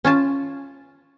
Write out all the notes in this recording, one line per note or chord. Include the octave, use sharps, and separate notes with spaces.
C#4 F4 A5